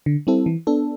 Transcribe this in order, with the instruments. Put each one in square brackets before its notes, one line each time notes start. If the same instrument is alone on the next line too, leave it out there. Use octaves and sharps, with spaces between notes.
[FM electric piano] D3
G3 C4 E4 A4
E3
B3 D4 A4